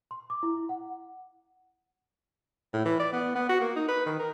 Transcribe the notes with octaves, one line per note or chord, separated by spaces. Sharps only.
C6
D6
E4
F#5
A2
E3
D5
B3
B3
F#4
A#3
D#4
B4
D#3
A#4